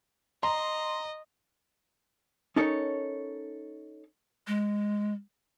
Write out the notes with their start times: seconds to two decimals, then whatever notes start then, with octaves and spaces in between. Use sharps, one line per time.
0.43 D#5 A#5 C6
2.56 C#4 D#4 A4 A#4 C#5
4.47 G#3